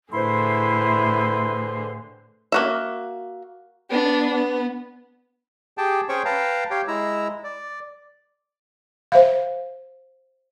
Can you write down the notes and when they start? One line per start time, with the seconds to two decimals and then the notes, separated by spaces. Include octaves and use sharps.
0.13 A2 D3 E4 G#4 B4 C5 C6
2.52 A#3 F#4 E5
3.90 B3 D4
4.34 B3
5.78 G4 G#4 G5 A5
6.09 C#4 G#4 C5 C#5 G5 C#6
6.25 B4 F5 G5 A5 A#5
6.70 G4 C#5 F5 G5
6.88 G#3 E4 A#5 E6
7.44 D5
9.12 C5 E5 F5